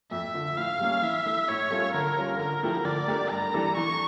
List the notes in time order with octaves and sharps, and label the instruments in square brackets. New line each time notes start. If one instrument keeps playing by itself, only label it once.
[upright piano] F2 [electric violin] E5
[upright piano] D3 F3
[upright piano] A2 [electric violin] F5
[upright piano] G3 A#3 C#4
[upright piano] E3 [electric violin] E5
[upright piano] A3 E4
[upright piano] A2 [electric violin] C#5
[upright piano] G3 C#4 F4 A4
[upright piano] D3 [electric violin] A#4
[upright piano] G3 C#4 F4 C#5
[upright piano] D3 [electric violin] A#4
[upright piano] F3 A3 E4 G4
[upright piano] D3 [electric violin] D5
[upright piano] A3 D4 G4 A#4
[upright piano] G2 [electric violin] A#5
[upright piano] E3 G3 D4 A4
[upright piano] E3 [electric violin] C#6